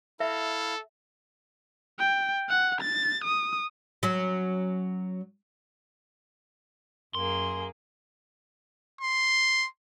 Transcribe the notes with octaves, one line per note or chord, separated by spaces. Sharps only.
E4 A4 E5 F5
G5
F#5
A6
D#6
F#3 C#4
F#2 A#3 G#4 C6
C6